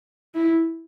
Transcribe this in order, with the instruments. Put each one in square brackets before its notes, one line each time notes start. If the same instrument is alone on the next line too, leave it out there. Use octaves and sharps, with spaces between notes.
[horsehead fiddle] E4